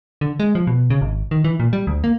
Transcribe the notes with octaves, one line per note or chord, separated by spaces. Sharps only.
D3
G#3
F3
B2
C#3
G#1
D#3
E3
A#2
G3
D2
A#3